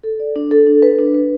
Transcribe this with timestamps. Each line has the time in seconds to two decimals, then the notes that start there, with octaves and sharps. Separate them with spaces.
0.04 A4
0.20 D5
0.36 D4
0.51 A4
0.67 D4
0.82 B4
0.99 D4
1.14 B4